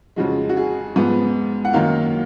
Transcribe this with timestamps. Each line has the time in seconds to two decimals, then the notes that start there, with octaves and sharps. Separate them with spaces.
0.16 F2 C#3 F3 G#3 F#4
0.49 F#4
0.57 G#4
0.96 G#2 F3 B3
1.65 F#5
1.73 F#2 D#3 A#3 F5